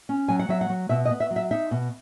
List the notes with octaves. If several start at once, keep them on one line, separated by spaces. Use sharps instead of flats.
C#4
F#3 G#5
F#5
F#3 E5
F#5
F#3
B2 E5
D#5
B3
E5
F#3
E5
D#4 E5
B2